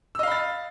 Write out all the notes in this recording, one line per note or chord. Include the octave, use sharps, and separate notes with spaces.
D#5 F5 B5 E6 A6